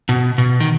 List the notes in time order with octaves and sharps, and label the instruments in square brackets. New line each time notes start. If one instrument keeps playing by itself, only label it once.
[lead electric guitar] B2
B2
D#3